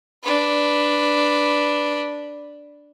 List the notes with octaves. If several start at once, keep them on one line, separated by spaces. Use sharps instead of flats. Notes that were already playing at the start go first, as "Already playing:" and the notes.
D4 B4